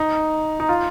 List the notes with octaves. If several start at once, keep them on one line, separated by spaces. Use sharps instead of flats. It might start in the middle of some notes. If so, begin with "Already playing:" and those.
Already playing: D#4
D#4
F4